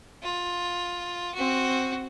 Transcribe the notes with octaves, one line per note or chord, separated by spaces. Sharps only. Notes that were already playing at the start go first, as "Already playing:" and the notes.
F4
C4 F#4